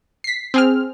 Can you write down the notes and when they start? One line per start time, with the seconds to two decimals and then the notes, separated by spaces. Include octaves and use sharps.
0.24 B6 C7
0.54 C4 G#4 F6